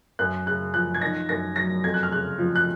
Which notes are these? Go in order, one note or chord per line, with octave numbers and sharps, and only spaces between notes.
F#2 F#6
C#3 F#6
F3 F#6
G#6
D#3 A#6
F#2 A#6
F#3 A#6
F2 G#6
F#6
F6
C#3 F#6
F3
F#6